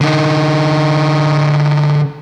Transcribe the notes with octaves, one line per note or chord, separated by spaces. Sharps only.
D3 D#4